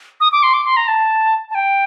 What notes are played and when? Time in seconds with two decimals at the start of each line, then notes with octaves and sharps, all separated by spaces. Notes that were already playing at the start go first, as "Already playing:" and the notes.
0.20 D#6
0.32 D6
0.43 C6
0.54 D6
0.65 C6
0.77 A#5
0.88 A5
1.50 A5
1.55 G5